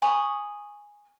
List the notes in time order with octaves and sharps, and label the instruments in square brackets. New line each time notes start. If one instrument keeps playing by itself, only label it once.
[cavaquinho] G#5 B5 C#6 D#6